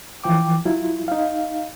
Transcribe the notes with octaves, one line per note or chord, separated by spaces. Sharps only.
E3 F3 G5 D6
F#3 E4 F4
D#4 F5